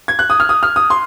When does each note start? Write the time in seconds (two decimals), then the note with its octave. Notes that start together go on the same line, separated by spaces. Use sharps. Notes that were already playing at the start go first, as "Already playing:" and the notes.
0.08 G#6
0.19 F#6
0.30 D#6
0.40 F6
0.49 D#6
0.63 F6
0.76 D#6
0.90 C6